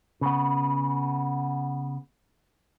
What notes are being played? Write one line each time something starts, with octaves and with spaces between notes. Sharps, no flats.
C#3 B3